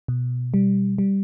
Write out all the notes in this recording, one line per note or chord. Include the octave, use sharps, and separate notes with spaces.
B2
G3
G3